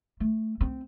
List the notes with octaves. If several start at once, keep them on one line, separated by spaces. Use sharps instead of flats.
A3
C4